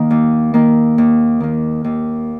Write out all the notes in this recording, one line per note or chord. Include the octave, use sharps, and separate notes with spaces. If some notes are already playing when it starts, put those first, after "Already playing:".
Already playing: D#3 A#3
D#2
D#3 A#3
D#2
D#3 A#3
D#2